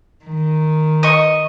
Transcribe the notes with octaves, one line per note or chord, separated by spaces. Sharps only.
D#3
D#5 C#6